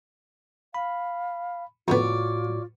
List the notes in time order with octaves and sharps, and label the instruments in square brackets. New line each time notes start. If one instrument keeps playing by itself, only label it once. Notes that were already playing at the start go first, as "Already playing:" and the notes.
[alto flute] F5 [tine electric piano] B5
[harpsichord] F2 D3 B3 [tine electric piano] A2 F#4 [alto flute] F4 [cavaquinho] C#5 D5